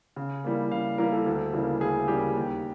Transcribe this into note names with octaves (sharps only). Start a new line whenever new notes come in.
C#3
E3 G3 A#3
C#3 F5
E3 G3 A#3 A#4
A4
D2
C#3 E3 G3 A#3
D2 G#4
C#3 E3 G3 A#3 G4
D#2